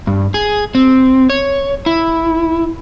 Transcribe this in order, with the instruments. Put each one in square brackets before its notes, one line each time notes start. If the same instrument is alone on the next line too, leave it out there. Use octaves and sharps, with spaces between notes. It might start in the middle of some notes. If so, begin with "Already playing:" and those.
[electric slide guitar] G2
G#4
C4
C#5
E4